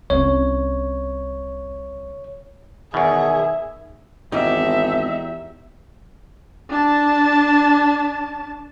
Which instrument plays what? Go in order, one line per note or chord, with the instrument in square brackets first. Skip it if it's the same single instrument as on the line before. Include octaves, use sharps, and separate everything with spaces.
[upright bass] C2 C#4 [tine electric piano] C#5
[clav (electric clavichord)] E2 B2 [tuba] D#3 [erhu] G#4 [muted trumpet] E5
[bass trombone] G#1 [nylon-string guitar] E2 G4 [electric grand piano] D#4 [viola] E5
[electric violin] D4 A5